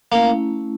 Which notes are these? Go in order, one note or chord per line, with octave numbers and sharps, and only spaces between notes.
A3 A#3 C#4 E4